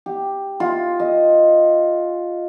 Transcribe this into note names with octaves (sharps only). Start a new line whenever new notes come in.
G4
F4
D#5